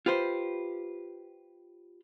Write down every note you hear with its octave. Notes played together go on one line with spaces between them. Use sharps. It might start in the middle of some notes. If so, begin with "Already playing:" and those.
F4 G4 B4 C5